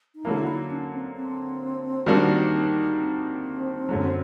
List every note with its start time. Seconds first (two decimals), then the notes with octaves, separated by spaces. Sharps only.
0.15 D#4
0.25 D3 F#3 A#3 E4
0.47 D#4
0.70 C#4
0.93 C4
1.16 C4
2.06 D#3 G3 A#3 D4 F#4
2.98 C4
3.89 F#2 D3 F#3